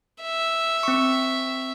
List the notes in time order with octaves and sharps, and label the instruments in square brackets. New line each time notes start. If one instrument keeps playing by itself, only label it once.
[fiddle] E5
[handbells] C4 C#6